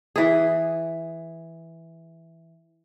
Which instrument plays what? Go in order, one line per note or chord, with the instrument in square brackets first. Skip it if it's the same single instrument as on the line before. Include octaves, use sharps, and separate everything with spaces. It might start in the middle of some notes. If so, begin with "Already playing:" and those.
[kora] E3 G#4